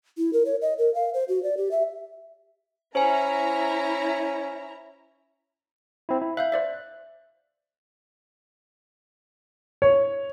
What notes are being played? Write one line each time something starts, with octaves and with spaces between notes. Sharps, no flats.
E4
A#4
C#5
D#5
A#4
F5
C5
F#4
D5
G4
E5
C#4 E4 C5 G#5 A#5
C4 E4
E4
E5 F5 F#6 G6
C5 D5 E5
C#5